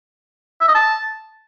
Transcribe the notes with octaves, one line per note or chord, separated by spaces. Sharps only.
E5
D#5
A5